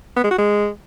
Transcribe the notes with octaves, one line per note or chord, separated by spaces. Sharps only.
B3
G#3
F#4
G#3